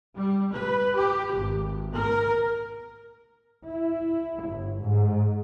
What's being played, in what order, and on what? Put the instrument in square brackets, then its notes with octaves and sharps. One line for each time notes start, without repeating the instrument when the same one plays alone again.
[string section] G3
B4
G4
G#1
A#4
E4
G1
G#2